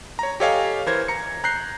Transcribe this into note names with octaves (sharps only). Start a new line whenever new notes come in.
C#5 A#5
G4 A4 C#5 D#5 F5 G#5
E3 A#4 C5 G#6
A#5 C#7
A#5 F#6 G6 C7